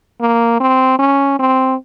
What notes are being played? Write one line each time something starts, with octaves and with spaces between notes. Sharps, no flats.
A#3
C4
C#4
C4